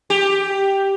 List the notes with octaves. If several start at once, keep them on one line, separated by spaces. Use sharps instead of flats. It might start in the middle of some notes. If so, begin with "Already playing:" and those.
G4